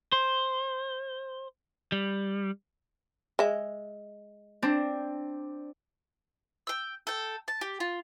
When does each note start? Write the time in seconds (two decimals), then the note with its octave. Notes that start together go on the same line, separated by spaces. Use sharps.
0.12 C5
1.92 G3
3.39 G#3 E5
4.62 C4 D4
6.67 G5 E6
7.07 A4 G5
7.48 A5
7.61 G4
7.80 F4